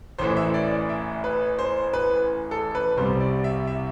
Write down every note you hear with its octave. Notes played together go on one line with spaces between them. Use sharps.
A1 A2 E3 C5
E5
D5
D5
E5
B4
C5
B4
A4
B4
C2 C3 G3 C5
D5
E5
E5